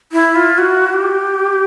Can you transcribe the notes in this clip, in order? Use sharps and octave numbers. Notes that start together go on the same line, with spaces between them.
E4
F4
F#4
G4